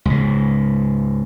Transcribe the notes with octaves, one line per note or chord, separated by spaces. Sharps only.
C#2 G#2